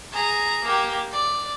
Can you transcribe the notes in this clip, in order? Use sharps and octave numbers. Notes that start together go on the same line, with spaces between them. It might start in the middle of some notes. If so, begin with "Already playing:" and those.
G#4 A#5
A#3 G4
D5